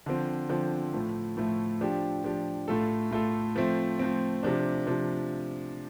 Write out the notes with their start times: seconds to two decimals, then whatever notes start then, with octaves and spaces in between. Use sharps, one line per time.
0.06 D3 F3 C4
0.49 D3 F3 C4
0.93 A2 F3 A3
1.37 A2 F3 A3
1.81 F3 D4 G4
2.24 F3 D4 G4
2.68 A2 A3 F4 A4
3.11 A2 A3 F4 A4
3.56 F3 A3 C4
3.99 F3 A3 C4
4.43 C3 F3 D4
4.87 C3 F3 D4